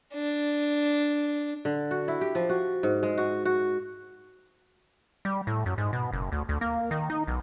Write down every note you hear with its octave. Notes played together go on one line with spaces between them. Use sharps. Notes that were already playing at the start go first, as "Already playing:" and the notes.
D4
D3
F#4
E4
G4
F3
F#4
G#2
G#3
F#4
F#4
G3
A2
F#2
G#2
B2
F#1
D2
D2
A#3
D#3
D#4
B1